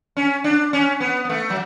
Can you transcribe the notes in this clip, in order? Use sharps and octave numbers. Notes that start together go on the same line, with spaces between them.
C#4
D4
C#4
B3
B3
A3
F#3